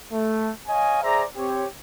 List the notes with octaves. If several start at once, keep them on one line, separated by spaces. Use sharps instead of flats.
A3
C#5 D#5 F5 G#5
G#4 C5 D5 E5 A#5
C4 G4 C#5